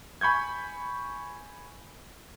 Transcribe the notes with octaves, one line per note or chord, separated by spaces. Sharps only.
G#5 B5 C#6 G6 G#6